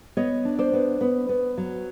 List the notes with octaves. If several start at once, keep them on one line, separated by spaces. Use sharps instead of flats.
B3 C#5 D#5
D4
C5 D5
B3
B3
B3
F#3